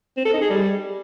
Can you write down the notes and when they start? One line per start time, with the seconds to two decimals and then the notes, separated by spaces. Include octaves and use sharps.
0.17 C4
0.25 A4
0.33 D#4
0.42 G#4
0.50 G3